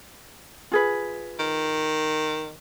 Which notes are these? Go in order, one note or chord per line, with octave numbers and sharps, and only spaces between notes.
F4 G#4 B4
D#3